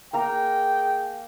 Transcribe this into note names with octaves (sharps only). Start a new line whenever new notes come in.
A#3 G#4 A#4 G5 A#5